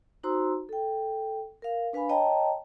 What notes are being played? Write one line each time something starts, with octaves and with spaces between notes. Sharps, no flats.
D#4 F#4 C5 A#5 C6 E6
A4 G5
A#4 F5
D4 B4 F5 G#5 B5
C#5 D#5 G5 A5 A#5